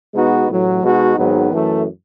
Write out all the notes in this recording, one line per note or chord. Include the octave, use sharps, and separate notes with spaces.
B2 G#3 B3 D#4 F#4
A1 A2 F#3
B2 G#3 D#4 F#4
G#1 G#2 D#3 F#3 B3
F#2 E3 A3